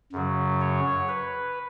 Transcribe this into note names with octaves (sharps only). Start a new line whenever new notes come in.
F#2 C#3 F#3
C#5
B4